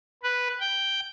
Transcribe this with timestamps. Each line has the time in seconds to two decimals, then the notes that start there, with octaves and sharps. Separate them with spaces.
0.23 B4
0.60 G5